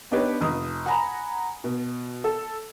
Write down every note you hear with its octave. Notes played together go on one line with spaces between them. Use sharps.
B3 D4 D#4 G4 B4 C#5
F1 D#6
F#5 G#5 A#5 B5
B2
A4